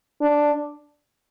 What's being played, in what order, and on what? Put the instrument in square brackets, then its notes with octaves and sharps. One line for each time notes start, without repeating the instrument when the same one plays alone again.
[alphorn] D4